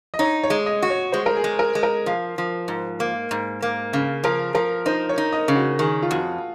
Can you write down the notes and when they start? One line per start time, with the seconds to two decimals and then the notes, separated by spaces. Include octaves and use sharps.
0.14 D#5
0.19 D#4 C#5
0.43 C#5
0.50 G#3
0.66 D#5
0.82 F#4
0.90 C#5
1.12 G#3 C5
1.26 A#4
1.37 G#4
1.44 G#3
1.59 A#4
1.75 G#3
1.83 A#4
2.06 F3 F5
2.38 F3
2.68 G#2
3.00 A#3
3.31 G#2
3.62 A#3
3.93 C#3 F5
4.24 F3 A#4
4.55 F3 A#4
4.86 D#4 C5
5.09 C#5
5.18 D#4
5.33 D#5
5.48 C#3
5.56 F#4
5.79 D#3 G#4
6.02 F4
6.10 F2 F#4